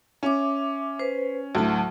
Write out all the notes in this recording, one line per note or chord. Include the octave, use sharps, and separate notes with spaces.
C#4 E5 D6
B4 C5
D2 A2 F#3 A5